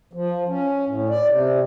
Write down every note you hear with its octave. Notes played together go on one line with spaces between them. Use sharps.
F3
C#4
A2
D5
C3